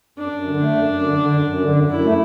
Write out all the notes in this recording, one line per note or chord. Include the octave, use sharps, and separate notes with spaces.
F#2 D4
F#2
D3
A3
F#2
F#2
D3
D3
F#2
F#2
D3
F#2
F#2 E4
A3